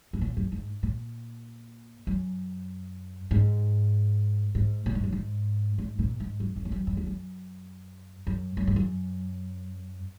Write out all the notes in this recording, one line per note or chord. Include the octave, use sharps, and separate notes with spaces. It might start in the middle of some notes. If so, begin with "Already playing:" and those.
G#2
A#2
F#2
G#2
A#2
F#2
G#2
G#2
A#2
G#2
F#2
G#2
G#2
A#2
G#2
F#2
F2
G#2
F#2
F#2
F2
F#2
F#2
F#2
G#2
F#2